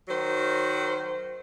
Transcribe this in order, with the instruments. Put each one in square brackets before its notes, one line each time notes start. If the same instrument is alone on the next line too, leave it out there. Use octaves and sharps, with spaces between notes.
[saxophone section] D#3 F#3 C5